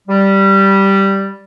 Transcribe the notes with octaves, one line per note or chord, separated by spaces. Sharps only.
G3